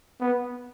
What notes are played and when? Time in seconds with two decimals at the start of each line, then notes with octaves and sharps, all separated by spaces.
0.20 B3